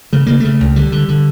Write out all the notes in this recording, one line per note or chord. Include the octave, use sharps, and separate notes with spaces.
C#3 A3
C#3 A#3
C#3 A3
C#2
D3 G3
D3
D3